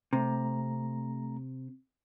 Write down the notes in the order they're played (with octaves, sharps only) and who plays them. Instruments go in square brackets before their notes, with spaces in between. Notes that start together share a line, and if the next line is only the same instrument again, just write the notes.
[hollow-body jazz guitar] C3 [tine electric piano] A3 A#5